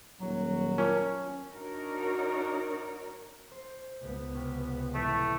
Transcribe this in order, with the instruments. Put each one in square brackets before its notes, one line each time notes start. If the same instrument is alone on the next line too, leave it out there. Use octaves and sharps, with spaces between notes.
[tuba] D#1 [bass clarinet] F#3
[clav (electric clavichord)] C#4 [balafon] F4 A#4 A5
[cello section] D4 D#4 F#4 A#4 C#5
[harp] C5
[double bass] C#2 B3
[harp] C3 C#4
[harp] A1 [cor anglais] A3